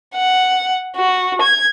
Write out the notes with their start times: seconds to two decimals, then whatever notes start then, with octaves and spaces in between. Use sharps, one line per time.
0.15 F#5
0.96 F#4
1.42 G#6